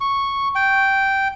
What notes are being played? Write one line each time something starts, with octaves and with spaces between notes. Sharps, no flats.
C#6
G5